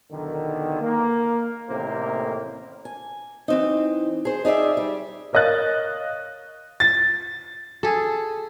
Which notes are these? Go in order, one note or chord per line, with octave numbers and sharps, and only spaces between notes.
B1 E2 D3 D#3
A#3
A1 A2 C3 D#3 A#3 C5
G#5
E3 C4 D#4
G#4 C5
D#4 G#4 D5 E5
G3
A#4 C#5 D#5 F5 F#6 A6
A6
G#4 A4